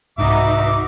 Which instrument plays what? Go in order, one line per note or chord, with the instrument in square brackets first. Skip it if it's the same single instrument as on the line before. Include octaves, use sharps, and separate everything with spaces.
[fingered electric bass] C2 G#2 [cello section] D#4 F#4 B4 [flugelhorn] E5 [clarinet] D6